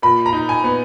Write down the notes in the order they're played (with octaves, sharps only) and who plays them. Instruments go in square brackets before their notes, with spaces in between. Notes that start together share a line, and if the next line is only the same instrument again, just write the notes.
[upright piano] A#2 B5
A#5
D#4
G#5
B3